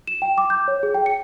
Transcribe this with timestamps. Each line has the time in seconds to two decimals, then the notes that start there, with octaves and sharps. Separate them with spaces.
0.07 E7
0.22 G5
0.38 D6
0.50 G6
0.68 C#5
0.83 G#4
0.94 G5
1.06 C#7